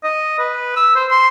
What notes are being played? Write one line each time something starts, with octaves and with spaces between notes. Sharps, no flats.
D#5
B4
E6
C5
C6